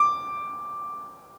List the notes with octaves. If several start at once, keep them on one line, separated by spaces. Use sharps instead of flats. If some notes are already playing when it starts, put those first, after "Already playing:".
Already playing: D6